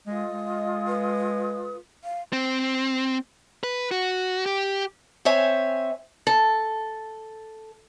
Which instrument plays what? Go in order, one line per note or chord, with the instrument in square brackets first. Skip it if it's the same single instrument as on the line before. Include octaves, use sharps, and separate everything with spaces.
[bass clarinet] G#3 [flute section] F4 A4 D#6 [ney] D#5
[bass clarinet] G#3
[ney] B4
F5
[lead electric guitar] C4
B4
F#4
G4
[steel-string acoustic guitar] C4 C5 C#5 E5 G#5
A4